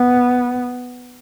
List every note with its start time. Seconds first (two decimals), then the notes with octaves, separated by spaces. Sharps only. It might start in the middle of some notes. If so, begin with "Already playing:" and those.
Already playing: B3